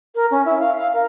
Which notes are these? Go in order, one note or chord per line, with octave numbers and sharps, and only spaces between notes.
A#4
C#4
E4
F5
F5
A#4